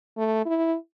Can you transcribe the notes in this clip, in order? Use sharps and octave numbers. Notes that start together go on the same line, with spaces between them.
A3
E4